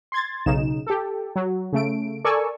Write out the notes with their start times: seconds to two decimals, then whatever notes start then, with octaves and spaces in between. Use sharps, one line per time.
0.12 C6 G#6 A6
0.46 B1 C#3 D#4 E7
0.87 G4 A4
1.36 F#3
1.73 C#3 A3 D7
2.24 A4 A#4 D5 G#5 C#6 E6